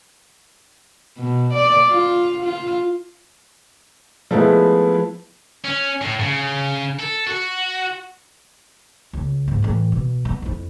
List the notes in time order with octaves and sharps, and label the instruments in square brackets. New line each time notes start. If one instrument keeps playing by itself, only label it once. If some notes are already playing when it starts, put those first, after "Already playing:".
[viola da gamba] B2
D5
F4
F4
[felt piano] F3 G#3 A3 B3 E4
[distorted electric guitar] C#4
A2
C#3
A4
F#4
[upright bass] C#2
G#2
A2 E3
B2
B3
F2 E4